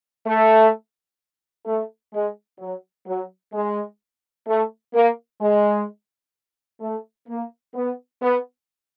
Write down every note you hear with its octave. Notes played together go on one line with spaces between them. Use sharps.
A3
A3
G#3
F#3
F#3
G#3
A3
A#3
G#3
A3
A#3
B3
B3